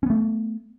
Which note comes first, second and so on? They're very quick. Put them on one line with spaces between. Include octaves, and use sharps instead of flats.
C#4 B3 A3